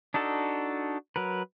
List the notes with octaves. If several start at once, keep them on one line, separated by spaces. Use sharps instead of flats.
D4 D#4 F#4 A4
F#3 A#4 B4